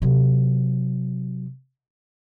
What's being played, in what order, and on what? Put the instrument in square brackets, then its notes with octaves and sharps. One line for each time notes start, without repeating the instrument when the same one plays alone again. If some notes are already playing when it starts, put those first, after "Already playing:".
[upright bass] C3 F#3